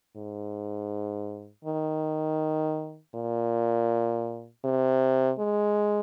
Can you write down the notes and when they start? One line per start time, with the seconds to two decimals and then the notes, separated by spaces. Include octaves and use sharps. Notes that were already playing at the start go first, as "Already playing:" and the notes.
0.16 G#2
1.65 D#3
3.15 A#2
4.65 C3
5.39 G#3